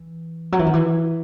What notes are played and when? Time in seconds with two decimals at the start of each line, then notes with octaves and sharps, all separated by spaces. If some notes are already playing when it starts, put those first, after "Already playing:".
Already playing: E3
0.52 F#3
0.59 E3
0.66 D#3
0.74 E3